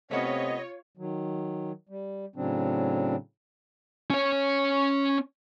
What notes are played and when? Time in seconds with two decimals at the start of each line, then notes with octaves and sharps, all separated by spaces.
0.11 C3 A3 B3 C#4 F4 C#5 D#5
0.98 D#3 F#3
1.89 G3
2.36 A2 C#3 F#3 C4 D4
4.10 C#4 C#5